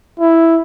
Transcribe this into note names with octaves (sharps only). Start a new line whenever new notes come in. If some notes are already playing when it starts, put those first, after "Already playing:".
E4